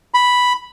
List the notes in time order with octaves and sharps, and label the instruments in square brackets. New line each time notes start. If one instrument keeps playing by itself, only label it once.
[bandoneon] B5